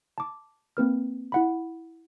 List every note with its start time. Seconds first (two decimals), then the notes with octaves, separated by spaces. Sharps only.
0.18 A5 D6
0.77 A#3 C4 B4 F6
1.32 E4 F#5 B5